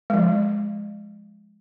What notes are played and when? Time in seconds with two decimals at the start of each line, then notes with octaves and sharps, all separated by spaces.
0.10 F3 G#3